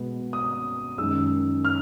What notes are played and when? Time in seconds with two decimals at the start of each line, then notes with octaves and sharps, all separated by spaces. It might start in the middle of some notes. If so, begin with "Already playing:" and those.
Already playing: B2 G#3 B3
0.33 D#6
0.98 F#2 D#3 G#3 E6
1.65 F6